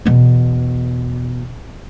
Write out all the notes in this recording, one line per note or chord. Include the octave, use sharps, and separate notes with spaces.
E2 B2